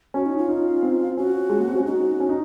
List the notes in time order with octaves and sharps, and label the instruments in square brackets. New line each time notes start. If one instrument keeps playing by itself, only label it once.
[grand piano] C#4 [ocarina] F#4
[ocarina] D#4
F4
[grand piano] D#4
C4
[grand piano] C#4 [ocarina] F#4
[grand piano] G#3
A#3
C4
C#4
[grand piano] D#4 [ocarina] F#4
[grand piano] C#4
D#4